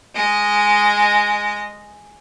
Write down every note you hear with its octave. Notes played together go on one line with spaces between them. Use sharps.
G#3 D#5